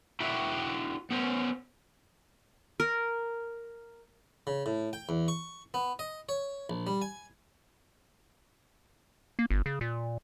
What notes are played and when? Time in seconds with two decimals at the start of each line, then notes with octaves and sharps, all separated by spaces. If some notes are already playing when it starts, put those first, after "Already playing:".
0.20 E4 F#4 G4 E5 G5
1.11 B3 C#4 C5
2.80 A#4
4.47 C#3
4.66 A2
4.93 G5
5.09 E2
5.28 C#6
5.74 B3
5.99 D#5
6.29 C#5
6.70 A#1
6.87 G3
7.02 G#5
9.39 A#3
9.50 G1
9.66 C#3
9.81 A#2